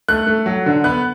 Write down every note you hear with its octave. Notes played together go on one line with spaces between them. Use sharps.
A3 F#6
A3
F#3
D3
B3 F#6